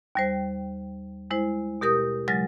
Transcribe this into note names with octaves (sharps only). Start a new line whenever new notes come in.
D#2 G3 C5
G#3 E4 C5
B2 G4 A#4 D#6 G6
C#3 F#3 G#3 A6 A#6